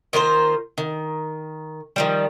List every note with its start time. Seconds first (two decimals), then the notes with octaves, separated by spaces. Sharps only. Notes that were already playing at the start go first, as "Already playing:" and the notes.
0.13 D#3 A#3 F4 C5
0.78 D#3
1.96 D#3 F3 G3